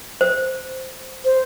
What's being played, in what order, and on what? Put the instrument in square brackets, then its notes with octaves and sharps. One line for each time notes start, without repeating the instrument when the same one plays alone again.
[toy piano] C5
[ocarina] C5